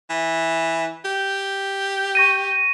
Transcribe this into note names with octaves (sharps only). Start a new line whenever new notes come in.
E3
G4
C#6 A#6 D#7